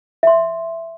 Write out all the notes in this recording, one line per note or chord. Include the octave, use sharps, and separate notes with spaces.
E5 C6